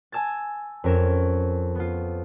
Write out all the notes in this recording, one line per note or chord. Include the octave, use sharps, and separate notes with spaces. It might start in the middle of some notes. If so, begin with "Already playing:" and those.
G#5 A5 E6 G#6 A6
F2 C#4 A#4 G#6 E7
B3 F4